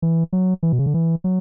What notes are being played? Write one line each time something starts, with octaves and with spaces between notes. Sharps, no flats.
E3
F#3
E3
B2
C#3
D3
E3
F#3